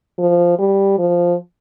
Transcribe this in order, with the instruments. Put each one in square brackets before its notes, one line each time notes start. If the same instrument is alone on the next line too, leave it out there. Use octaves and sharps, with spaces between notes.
[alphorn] F3
G3
F3